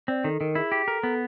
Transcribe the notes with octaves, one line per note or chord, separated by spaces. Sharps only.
C4 D5
D#3 A4
D#3 A#4
E4 G#4
G4
A4 A#4
B3 A4